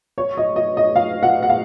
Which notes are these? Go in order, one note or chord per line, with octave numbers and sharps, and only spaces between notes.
C#5
D#5
D#5
D#5
F5
F#5
F#5
F5